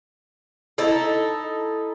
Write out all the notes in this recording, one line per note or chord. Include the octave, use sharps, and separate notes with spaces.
D#4 E4 A4